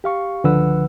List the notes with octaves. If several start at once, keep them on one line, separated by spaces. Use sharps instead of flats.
G4 F5 C#6
C#2 D3 F3 B4 F#5 E6